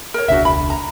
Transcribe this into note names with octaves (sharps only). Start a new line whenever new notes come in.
A#4 C#5
E1 C#2 D4 F#4 E5
B5
A#5